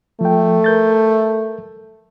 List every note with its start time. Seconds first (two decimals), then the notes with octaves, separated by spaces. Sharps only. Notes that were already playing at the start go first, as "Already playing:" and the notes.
0.21 F3 A3 G5
0.64 A#4 G6 A6